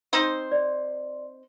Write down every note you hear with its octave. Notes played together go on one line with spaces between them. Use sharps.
C4 D#4 C5
D5